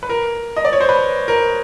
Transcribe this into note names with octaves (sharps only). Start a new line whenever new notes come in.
B4
A#4
D#5
D5
C#5
C5
B4
A#4